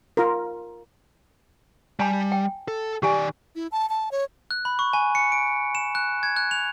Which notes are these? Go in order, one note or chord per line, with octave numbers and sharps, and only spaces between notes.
F4 A#4
G3 G#5 A5 B5
G5
A4
D#3 G4 D5 G#5
E4
A5
A5
C#5
F#6
B5
C#6
G#5
C#7
D7
E7
F#6
G#6
F#6
F7